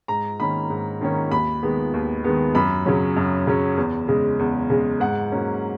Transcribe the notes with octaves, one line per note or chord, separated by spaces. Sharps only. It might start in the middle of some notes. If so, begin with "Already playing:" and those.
G#2 A#5
D#3 A#3 C#4 B5
G#2
D#3 A#3 C#4
D#2 B5
D#3 G#3 B3
D#2
D#3 G#3 B3
F#2 B5
C#3 F#3 C#4
F#2
C#3 F#3 C#4
E2
C#3 G#3
E2
C#3 G#3
G#2 F#5
F#3 A#3 C#4